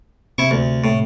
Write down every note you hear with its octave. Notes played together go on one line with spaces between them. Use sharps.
C3 E4 C#6
D2
A2